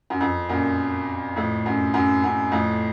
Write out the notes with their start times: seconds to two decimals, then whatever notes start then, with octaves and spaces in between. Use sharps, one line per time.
0.10 F#2
0.21 F2
0.49 F#2 A#2
1.36 F2 A2
1.66 F#2
1.94 F#2
2.24 F#2
2.52 F2 A2